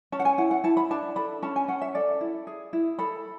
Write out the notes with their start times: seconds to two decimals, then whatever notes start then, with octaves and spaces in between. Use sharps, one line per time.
0.12 C#4 A5
0.20 F#5
0.25 G#5
0.38 E4 F#5
0.51 F#5
0.64 E4 A5
0.77 B5
0.91 D4 A5
1.16 A4 B5
1.42 C#4 A5
1.56 G#5
1.68 C#4 F#5
1.82 E5
1.95 A4 D5
2.21 E4
2.47 G#4
2.73 E4
2.99 A4 B5